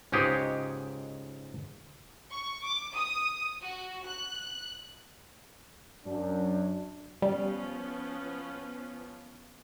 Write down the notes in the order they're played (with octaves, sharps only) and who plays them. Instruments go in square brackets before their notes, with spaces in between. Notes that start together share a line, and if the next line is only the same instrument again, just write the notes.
[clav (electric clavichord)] C#2 G#2 D#4 G4 G#4 C#5
[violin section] C#6
D6
D#6
F#4
F#6
[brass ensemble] F#2 [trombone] D4
[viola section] F3 B3 C#4 [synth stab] G3